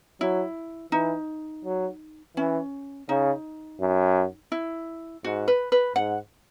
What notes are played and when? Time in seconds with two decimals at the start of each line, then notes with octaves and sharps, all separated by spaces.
0.21 F#3 E4
0.92 E3 D#4
1.65 F#3
2.37 E3 C#4
3.09 C#3 D#4
3.81 F#2
4.52 E4
5.24 G#2 F#4
5.48 B4
5.72 B4
5.96 G#2 F#5